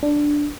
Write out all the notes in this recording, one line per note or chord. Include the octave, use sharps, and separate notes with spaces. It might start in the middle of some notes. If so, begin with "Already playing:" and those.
D4